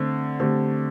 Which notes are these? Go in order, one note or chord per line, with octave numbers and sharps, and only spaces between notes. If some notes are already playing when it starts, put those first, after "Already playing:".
Already playing: D3 A3 C4
D3 A3 C4 G4